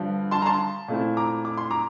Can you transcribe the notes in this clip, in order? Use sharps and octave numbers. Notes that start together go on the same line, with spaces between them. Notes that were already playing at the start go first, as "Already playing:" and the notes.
Already playing: G2 D3 F3
A5 C6
A#5
A5 C6
A#2 A3 C4 E4
A#5 D6
D6
C6
A#5 D6